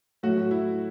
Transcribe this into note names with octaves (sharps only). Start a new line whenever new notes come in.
A2 F#3 A3 F#4
F#4
E4